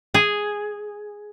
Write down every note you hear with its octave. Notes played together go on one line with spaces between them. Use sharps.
G#4